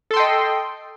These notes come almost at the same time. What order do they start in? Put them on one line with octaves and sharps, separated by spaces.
A4 C6 G5 D#5